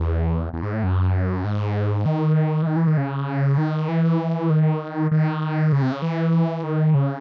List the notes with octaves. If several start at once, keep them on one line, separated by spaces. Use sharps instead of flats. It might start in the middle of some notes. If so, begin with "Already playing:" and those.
Already playing: E2
E2
G#2
A2
F#2
G#2
D#3
E3
D#3
E3
D#3
C#3
D#3
E3
D#3
D#3
C#3
C3
C#3
E3
D#3
C#3